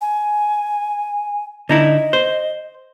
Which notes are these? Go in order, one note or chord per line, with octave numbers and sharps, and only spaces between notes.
G#5
D3 D#4 E4 D#5
C5